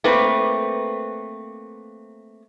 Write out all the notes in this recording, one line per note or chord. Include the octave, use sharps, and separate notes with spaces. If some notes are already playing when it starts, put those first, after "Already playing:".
A3 A#3 C4 B4